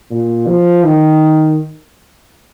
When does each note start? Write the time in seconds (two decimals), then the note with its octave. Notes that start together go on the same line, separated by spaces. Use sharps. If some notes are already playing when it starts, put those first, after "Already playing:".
0.11 A#2
0.47 F3
0.84 D#3